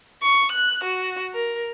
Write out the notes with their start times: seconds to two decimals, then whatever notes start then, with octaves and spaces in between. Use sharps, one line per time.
0.22 C#6
0.52 F#6
0.84 F#4
1.34 A#4